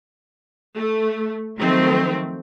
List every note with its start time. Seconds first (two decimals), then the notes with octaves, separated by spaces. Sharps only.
0.75 A3
1.60 D#3 F3 F#3 A3 C4